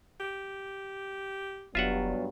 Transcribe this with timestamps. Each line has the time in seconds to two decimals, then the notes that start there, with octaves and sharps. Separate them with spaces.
0.20 G4
1.75 F1 G2 F#3 B3 F4 E5 F#5